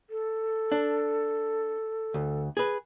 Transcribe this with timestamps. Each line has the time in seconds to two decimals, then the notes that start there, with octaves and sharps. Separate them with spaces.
0.10 A4
0.72 D4
2.14 D2
2.57 G#4 B4